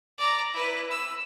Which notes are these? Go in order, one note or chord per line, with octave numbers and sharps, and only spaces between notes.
D5 A#5
E4 B4
E6